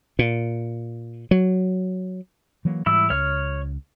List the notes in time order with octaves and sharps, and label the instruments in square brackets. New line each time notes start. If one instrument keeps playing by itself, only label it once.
[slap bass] A#2
F#3
[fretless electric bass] E3 F#3 A#3
[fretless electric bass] G#2 E3 G3 [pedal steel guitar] E4 E6
[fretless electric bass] C#2 [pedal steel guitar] C#5 F6